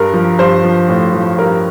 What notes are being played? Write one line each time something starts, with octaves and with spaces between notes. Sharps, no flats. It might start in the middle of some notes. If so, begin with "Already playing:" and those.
Already playing: G2 A#4
F3
G2 C5
F3
A2
F3
G2 A#4